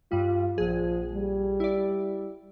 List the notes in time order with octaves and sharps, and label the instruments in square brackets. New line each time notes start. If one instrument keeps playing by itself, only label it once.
[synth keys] G2 G3 [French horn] F4
[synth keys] A#1 G#4 [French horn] F3
[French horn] G3
[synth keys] E4 D5